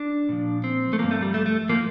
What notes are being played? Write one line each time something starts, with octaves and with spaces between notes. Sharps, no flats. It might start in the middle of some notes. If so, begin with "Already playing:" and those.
Already playing: D4
A#2 F3
C4
A3
G2 F3 A#3
A3
G3
A3
A3
A2 F3 A#3